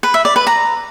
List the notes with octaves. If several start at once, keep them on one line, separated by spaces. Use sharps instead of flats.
B4
E5
D5
B4
A#5